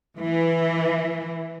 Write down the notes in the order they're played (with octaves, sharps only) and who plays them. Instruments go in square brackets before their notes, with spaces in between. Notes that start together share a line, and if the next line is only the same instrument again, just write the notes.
[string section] E3